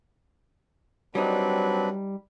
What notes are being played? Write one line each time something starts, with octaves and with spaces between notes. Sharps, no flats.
F#3 G3 C4 D4 D#4 B4